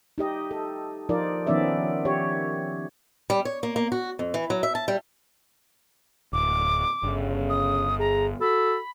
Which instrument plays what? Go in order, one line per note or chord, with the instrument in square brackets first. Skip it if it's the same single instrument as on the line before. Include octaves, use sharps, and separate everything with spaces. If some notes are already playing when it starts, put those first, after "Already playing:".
[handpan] D#4 G4 D#5
A4
F3 D#4 F4 A#4 D5
D#3 F3 B3 C#4 D5 E5
G4 C#5
[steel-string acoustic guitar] G3
C#5
A#3
A#3
F#4
F2
E3
F#3
E5
A5
G3
[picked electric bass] D1 [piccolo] D6
[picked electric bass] G1 [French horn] C#3
[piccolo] D#6
[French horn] G#4 [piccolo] A#5
[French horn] F#4 [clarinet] A4 [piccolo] B5